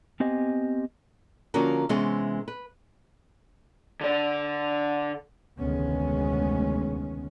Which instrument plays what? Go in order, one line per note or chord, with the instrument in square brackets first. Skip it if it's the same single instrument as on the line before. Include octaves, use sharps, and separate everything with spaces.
[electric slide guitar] B3 C4 G4 D#5 G#5
[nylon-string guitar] D3 F3 A#3 C#4 F#4 A#4
C3 E3 G#3 B3 C#4 G#4
B4
[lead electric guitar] D3 D5
[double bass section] F1 D2 D#3 G#3 B3 C#4